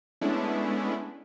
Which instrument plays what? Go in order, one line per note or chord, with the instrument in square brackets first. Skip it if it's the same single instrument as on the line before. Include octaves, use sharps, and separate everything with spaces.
[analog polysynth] G#3 A3 B3 C#4 D4 E4